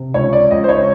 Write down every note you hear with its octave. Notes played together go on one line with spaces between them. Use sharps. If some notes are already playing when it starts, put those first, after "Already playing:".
Already playing: C3
C#2 C#5
D5
C#2 D#5
C5
C#5